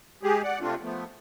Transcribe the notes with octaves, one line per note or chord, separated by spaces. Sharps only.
G#3 G4 G#4
D5 F#5
C3 A3 C4 D4 F4
F3 A3 B3